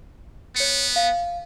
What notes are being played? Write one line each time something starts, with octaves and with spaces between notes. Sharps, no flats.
B3 C#5 C#7
F5